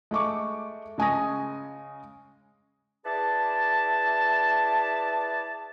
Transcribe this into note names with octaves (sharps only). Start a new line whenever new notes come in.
G#3 A3 C#6 D6
C#3 G#3 G#5 C#6 D#6 A#6
E4 G#4 B4 D5 A5